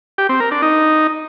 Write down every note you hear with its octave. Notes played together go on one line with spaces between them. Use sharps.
G4
C4
A#4
D4
D#4